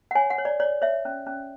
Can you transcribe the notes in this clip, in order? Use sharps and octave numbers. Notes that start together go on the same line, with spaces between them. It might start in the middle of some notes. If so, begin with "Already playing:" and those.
F#5
C#5 G#5
F#5
C#5
D5
C#5 D5
C#5 E5
C#4
C#4